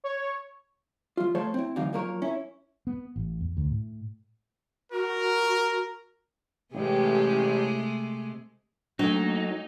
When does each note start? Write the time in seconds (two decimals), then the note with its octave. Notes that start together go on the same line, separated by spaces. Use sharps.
0.04 C#5
1.17 F3 F4
1.35 F3 A3 A4 C5 C#5
1.54 C4 E4
1.76 D2 E3 F#3 D#4 F5
1.93 F#2 F3 A#3 A#4 B4 C#5
2.22 C#4 E4
2.87 B3
3.16 A1
3.41 E2
3.57 D2
3.71 A2
4.92 F#4 A#4
6.74 A1 C3 G#3 A3 G4
8.99 F#3 A3 A#3 D4 D#4 A4